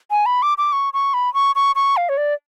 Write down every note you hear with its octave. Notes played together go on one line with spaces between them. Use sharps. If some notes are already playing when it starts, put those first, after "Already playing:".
G#5
B5
D6
D6
C#6
C#6
B5
C#6
C#6
C#6
F5
C#5
D5